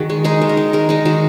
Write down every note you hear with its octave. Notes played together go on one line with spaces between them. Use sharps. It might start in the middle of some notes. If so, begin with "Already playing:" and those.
Already playing: D#3 F#4 G#4
G#3
G#3 D#4
D#3
A#4
D#3
G#3 A#4
G#3 D#4
D#3 F#4